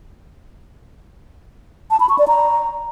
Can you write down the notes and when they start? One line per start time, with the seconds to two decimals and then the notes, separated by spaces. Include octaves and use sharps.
1.91 A5
2.00 B5
2.09 C#6
2.19 D5
2.28 A#5